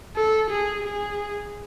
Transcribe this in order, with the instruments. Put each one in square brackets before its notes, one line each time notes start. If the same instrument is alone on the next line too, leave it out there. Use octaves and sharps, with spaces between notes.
[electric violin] A4
G#4
G#4